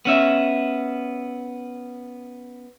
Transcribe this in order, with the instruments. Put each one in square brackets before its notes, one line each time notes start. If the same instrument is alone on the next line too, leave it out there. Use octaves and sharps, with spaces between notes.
[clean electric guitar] B3 C#4 E5